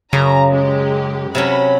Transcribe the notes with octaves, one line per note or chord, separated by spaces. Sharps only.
F#2 C#3 A#5
G#3 G4
C3 F#3 C#4 B5